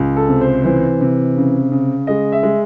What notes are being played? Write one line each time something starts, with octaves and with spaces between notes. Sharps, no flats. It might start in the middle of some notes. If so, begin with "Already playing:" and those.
Already playing: C#2
A4
C3
C5
E3 C5
C3
C#3
C#3
G#3 D#5
E5
G#3